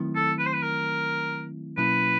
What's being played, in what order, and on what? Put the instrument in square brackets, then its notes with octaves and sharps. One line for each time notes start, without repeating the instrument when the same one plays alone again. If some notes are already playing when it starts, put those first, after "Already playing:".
Already playing: [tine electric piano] D#3 F#3 A3 C4 E4
[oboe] A4
B4
C5
B4
A#4
[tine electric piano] B2 F#3 A#3 C#4 E4 [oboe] B4